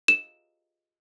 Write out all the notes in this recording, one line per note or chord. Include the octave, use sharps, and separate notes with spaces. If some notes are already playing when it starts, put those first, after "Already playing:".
E7